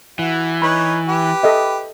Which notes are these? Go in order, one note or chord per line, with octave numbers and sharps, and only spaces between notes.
E3 F#4
D#4 B4 C#5 B5
G4 B4
A4 D#5 E5